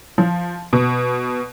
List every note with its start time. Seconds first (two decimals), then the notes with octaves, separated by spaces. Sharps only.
0.18 F3
0.73 B2